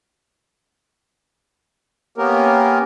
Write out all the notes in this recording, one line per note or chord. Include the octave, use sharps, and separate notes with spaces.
A#3 B3 C#4 G4 A#4